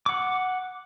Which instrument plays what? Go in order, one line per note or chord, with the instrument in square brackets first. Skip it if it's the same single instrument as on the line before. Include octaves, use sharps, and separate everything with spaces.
[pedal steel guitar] F#5 D6